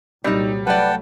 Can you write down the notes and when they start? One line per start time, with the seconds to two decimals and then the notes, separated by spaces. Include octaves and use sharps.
0.24 C2 A#2 F#3 G3 C4 D#4
0.67 F#3 A3 B4 D5 F#5 G5 A5